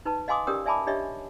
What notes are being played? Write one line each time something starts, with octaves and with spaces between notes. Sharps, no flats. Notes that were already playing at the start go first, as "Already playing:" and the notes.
D#4 B4 A5
D#5 F5 G#5 C6 D6 D#6
C#4 G4 A#4 D5 G5 D#6
D5 E5 G#5 A5 B5 D6
D4 G4 C#5 D#5 E5